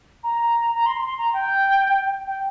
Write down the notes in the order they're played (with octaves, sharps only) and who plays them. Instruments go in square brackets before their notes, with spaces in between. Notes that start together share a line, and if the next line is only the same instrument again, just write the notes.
[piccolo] A#5
A#5
C6
C6
A#5
G5
G5